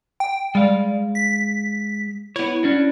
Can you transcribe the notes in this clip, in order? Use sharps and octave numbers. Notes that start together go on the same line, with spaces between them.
G5
G3 G#3 F5
B6
B3 E4 C#5
C#4 D4 F#4